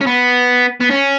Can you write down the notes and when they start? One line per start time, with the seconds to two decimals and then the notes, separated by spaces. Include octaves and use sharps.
0.01 C#4
0.07 B3
0.81 B3
0.91 C#4